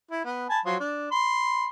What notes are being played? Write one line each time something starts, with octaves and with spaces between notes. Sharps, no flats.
E4
B3
G#5 A5 B5
F3 F#3 C6
D4
B5 C6